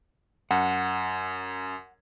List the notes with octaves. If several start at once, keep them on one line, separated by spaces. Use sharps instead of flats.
F#2 F#5